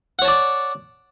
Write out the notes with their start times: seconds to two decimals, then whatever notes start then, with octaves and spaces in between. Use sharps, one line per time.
0.19 F#5
0.22 C#5
0.25 A5
0.28 D5